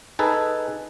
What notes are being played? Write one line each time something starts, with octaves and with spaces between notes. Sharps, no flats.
D#4 G#4 A4 B4